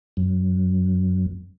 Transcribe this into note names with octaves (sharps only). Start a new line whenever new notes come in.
F#2